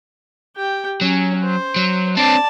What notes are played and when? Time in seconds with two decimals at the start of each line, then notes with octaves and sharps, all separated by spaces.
0.56 G4 G5
1.01 F#3 C#4
1.43 C5
1.76 F#3
2.17 C4 D4 D5 A5